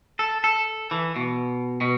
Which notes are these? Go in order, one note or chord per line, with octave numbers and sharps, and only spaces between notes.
A4
A4
E3
B2
B2